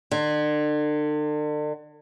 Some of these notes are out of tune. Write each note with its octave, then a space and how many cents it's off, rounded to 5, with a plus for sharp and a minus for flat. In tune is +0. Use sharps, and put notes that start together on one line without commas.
D3 +40